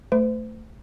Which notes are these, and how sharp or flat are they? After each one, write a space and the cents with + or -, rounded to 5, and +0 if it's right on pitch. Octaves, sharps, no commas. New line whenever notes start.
A3 +10 C5 -40